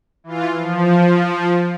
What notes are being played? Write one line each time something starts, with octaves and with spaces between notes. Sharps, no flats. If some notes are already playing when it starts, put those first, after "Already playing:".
E3 F4
F3